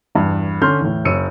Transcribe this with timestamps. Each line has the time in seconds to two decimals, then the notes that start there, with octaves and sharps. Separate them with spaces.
0.15 E2 G2
0.62 D3 C#4 C6 F6 G6
0.81 E2 A2
1.05 F#1 C#5 E6 C#7 D#7